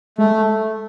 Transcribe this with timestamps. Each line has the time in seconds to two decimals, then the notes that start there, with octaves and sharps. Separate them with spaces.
0.18 G#3 A3